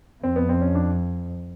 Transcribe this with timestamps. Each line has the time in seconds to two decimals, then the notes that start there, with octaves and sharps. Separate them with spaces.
0.23 F2 C4
0.36 B3
0.49 C4
0.61 C#4
0.75 D4